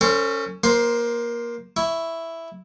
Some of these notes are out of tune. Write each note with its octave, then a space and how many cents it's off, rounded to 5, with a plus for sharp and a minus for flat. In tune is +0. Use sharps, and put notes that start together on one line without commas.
C#4 +0 A4 +45 C5 +0
A#3 +20 C5 +0 C6 +5
E4 +0 C#6 +0